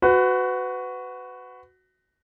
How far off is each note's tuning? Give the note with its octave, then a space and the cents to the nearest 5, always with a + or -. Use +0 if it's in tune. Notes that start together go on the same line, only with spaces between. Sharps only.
F#4 +0 B4 +25